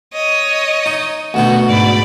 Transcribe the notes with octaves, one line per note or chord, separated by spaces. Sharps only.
C#5 D#5
D#4
D2 B2 D#4 F#4
G#2 D5 B5